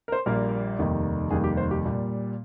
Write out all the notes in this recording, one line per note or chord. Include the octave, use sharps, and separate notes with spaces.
A#4
C5
A#1 A#2 G3 A#3 A#4
F1 D#2 D#3 G3
F1 D#2 D#3 G3 G#4
G4
C5
G4
A#2 G3